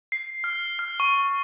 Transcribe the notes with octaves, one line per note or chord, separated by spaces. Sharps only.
C7
F6
F6
C#6